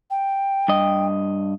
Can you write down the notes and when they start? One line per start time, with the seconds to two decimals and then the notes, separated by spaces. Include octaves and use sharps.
0.10 G5
0.68 G2 D#5